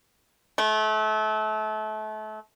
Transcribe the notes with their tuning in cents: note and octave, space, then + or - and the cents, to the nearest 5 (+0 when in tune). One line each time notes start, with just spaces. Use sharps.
A3 -30